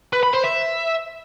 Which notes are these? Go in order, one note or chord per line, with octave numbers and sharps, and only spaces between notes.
B4
B5
C5
E5